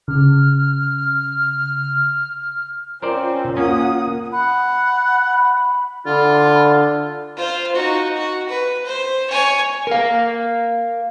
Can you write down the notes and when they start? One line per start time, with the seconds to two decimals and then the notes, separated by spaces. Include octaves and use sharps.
0.08 C#3 F6
3.02 C4 C#4 F4 A#4 C5 D5
3.57 A#3 C#4 F#5 D#6
4.32 F#5 B5
6.06 D3 F4
7.36 F4 C5
7.75 D#4 F#4
8.17 F#4
8.49 B4
8.86 C5
9.30 C#5 G#5
9.87 A#4 F5